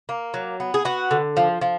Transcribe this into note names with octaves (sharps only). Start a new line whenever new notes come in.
A#3
F#3
B3
G#4
B3 F#4
D3
F3
F3